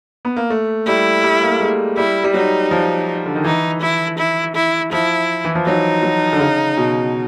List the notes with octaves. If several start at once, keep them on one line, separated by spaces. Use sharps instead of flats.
B3
A#3
A3
G3 E4
G3
A#3
A3
G#3
G3 E4
G3
F#3 D#4
F3
D3
D#3
E3 D#4
E4
E4
E4
F3 E4
E3
F3
F#3 D#4
F#3
D3
C#3
B2